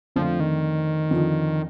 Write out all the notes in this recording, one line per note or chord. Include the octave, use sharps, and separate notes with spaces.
F2 D3 F3 A3 C4
D#3
F2 D3 F3